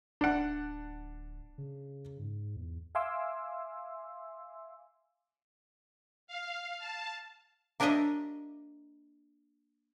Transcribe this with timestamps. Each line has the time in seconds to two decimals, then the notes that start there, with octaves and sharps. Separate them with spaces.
0.21 D1 D4 F#5
1.58 C#3
2.19 G#2
2.56 E2
2.95 E5 F5 G#5 C6 D6 E6
6.27 F5
6.79 A5
7.80 A#3 D4 G4 C#5 D#5 E5